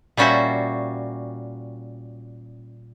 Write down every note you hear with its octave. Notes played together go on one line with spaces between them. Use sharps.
A#2 G3 C#4 F#4 C5 E5